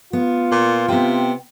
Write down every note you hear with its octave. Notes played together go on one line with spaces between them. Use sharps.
B3 F4
A#2
C3 B3 G5